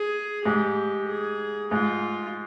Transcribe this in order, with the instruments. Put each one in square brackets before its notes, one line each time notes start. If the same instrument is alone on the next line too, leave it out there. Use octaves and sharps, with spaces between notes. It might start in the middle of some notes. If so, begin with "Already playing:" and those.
Already playing: [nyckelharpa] G#4
[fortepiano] G#2 [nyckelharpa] G4
[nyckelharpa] G#4
[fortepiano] G#2 [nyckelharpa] F4